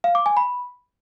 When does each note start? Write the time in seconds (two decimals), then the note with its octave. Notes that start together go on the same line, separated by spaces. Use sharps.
0.04 F5
0.15 D6
0.26 G#5
0.37 B5